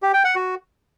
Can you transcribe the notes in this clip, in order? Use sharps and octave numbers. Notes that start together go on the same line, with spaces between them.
G4
G5
F#5
F#4